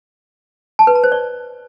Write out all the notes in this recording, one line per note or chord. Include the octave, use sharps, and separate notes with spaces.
A5
B4
A#5
C5
D5